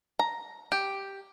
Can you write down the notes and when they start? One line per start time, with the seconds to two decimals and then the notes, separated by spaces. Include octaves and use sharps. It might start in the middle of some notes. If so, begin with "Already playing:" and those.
0.19 A#5
0.72 G4